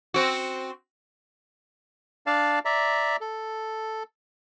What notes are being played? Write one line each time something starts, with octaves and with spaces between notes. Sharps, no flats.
C4 F#4
D4 D5 F5 A5
D5 E5 A#5
A4